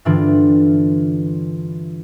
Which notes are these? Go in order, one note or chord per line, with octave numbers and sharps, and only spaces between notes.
G2 D3 E3 D4 F4